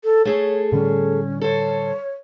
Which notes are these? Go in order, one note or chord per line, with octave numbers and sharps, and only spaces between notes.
A4
A3 G#4 A4 C#5
A2 D3 G3 C#4
A4 C5 C#5